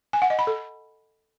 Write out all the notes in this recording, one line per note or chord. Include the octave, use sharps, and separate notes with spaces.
G#5
F#5
D#5
B5
A4